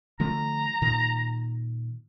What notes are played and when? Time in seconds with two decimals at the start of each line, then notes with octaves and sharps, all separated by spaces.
0.20 D3 F3 A3 A#5
0.82 A#2 D#3